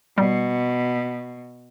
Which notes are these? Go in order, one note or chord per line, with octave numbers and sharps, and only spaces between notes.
B2 G3